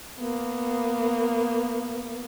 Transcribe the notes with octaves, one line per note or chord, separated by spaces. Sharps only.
A#3 B3